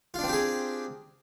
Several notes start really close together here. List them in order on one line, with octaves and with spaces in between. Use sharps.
F4 D4 C4 G4 G#4